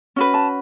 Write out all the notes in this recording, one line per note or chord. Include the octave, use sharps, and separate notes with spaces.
C#4 F#4 B4
A5